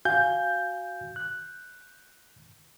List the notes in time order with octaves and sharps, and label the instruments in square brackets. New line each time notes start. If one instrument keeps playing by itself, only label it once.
[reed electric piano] F#4 F5 G#5 [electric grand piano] G6
[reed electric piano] F#6